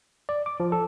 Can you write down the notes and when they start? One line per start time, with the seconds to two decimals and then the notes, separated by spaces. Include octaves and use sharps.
0.29 D5
0.46 D6
0.60 F3
0.72 A4